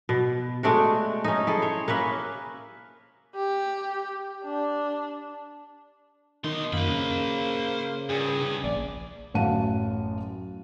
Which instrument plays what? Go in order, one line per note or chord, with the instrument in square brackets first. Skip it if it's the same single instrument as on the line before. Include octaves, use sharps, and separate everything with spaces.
[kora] B2
G#3 A3 D4 F#4
C#4 D#4
E4 G#4 A4
C5 C#5
A#3 C#4 B4 E5
[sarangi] G4
D4
[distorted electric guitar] B2 C6 [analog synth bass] D#3 [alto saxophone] D#4
[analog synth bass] F#2 [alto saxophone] A#3 [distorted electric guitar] C5 B5
[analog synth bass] C#3
[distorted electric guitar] G2 [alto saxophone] G#4
[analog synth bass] A#1 [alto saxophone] D5
[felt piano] A1 F#2 F5 F#5 A5 D#7